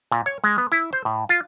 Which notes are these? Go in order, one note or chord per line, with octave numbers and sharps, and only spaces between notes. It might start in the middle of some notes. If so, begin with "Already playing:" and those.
A#2
C#5
G#3
B3
E4
C5
A2
F4